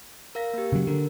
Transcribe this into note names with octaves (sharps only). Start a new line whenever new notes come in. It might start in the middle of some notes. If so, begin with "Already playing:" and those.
A#4 F5 A#6
A#3 G4
C#3 F#3
D3 A#4